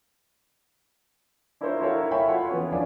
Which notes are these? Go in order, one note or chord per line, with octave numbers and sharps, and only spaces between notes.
D4 E4 F4 A#4 C5 C#5
E4 F#4 A4 A#4 C#5 F5
C#5 E5 F5 G5 B5 C#6
F4 F#4 A4 C#5 F#5 C6
E3 B3 C#4
G#1 F2 C#4 D4 F5 G#5